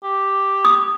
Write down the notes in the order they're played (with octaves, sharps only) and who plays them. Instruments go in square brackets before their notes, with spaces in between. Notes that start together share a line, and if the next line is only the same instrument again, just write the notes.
[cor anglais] G4
[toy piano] D#6